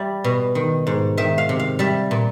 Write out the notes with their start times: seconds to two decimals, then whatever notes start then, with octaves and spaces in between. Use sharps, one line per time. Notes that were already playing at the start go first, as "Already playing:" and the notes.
Already playing: G3 E5
0.24 B2
0.55 D#3
0.87 G#2
1.17 D#3 E5
1.38 F5
1.49 C3
1.59 F5
1.79 G3 E5
2.11 A#2